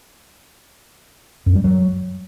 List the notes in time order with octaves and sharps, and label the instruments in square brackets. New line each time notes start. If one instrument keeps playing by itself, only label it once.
[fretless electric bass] F#2
G3
F#3